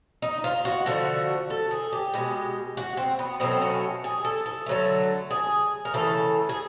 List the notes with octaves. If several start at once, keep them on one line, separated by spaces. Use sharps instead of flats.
D#4
F4
F#4
D3 F3 A3 F#4
A4
G#4
G4
B2 G#3
F#4
C4
B3
B2 F#3 A3 C4
C4
C#4
G#4
A4
A4
D3 F#3 A3
G#4
A#4
C#3 E3 A3 A4
G#4